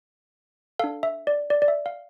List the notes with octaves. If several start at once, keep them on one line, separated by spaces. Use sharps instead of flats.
D4 A4 F5
E5
D5
D5
D5
E5
F5